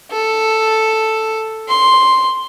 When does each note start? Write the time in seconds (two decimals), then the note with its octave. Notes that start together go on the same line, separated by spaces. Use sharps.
0.12 A4
1.68 C6